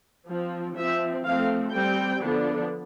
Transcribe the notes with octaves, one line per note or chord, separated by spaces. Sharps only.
F3 C4
F3 C4 E5
F3 A3 C4 F5
G3 C4 G5
D3 F3 B3 D4